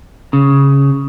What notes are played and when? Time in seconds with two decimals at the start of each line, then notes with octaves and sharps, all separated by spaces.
0.33 C#3